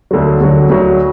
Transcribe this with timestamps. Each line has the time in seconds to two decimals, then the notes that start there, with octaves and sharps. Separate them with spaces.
0.11 D2 D3 F#3
0.40 D2 D3 F#3
0.69 D2 D3 F#3